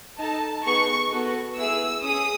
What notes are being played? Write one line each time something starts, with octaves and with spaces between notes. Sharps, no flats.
D#4 A4 A5
B3 D#4 G#4 C#6
B3 F#4 A4
B3 E4 G#4 E6
C#4 G#4 D#6